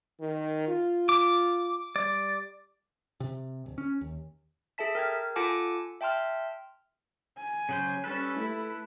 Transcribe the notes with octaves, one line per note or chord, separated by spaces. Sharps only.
D#3
F4
D6
G3 D5
C3
D1
C#4
D#2
G#4 A4 E5 A5 B6
A#4 G5 F6 G#6
F4 A4 F#5 G#5 A5 D6
E5 G5 A5 C6 F6
G#5
C#3 F#3 C5
G3 C#4 A4 B4
A3 E4